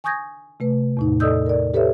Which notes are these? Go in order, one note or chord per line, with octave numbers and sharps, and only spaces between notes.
G#5 C#6 D#6 G6 G#6 A#6
C3 A3 B4
E2 A2 D#4
A4 D5 D#5 D#6 E6 G6
A#4 D5
G4 A4 B4 C#5 E5